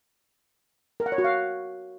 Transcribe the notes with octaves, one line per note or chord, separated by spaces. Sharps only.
A#4
F#5
C#5
F#4
F5